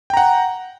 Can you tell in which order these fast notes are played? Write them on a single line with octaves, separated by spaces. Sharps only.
G5 A#5 F#5